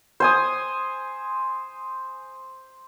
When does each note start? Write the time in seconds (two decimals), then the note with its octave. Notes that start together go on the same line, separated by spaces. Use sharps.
0.20 C5 G#5 D#6